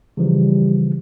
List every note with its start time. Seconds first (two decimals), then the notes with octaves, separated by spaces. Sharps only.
0.17 C#3 E3 F3 G3